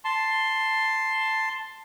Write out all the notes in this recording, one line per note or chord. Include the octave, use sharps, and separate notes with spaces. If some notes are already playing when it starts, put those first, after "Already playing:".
A5 C6